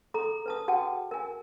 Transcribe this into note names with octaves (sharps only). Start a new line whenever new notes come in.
G#4 A4 A#5
B4 A5 D#6
F#4 G#4 F#5 G5 A5
A#4 G#5